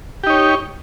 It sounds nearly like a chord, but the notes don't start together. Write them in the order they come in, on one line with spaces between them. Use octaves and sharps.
G4 D#4 C#5